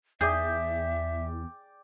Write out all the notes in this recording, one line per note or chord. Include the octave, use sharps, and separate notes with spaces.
E2 G#4 D5 E5 G5